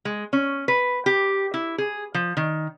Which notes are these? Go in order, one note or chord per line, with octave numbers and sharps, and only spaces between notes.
G#3
C#4
B4
G4
E4
G#4
F3
D#3